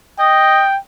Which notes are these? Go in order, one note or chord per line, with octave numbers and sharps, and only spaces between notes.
D#5 G5